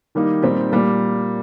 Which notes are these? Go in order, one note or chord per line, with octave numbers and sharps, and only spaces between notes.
D#3 G3 A#3 D#4
A#2 G3 C4 D#4 G4
A#2 G3 A#3